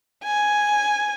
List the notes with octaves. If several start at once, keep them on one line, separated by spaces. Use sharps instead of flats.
G#5